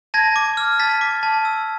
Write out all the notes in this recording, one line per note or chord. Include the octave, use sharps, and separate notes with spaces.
A5 G#6 A#6
D6
F6
A5 A6 B6
D6
A5
E6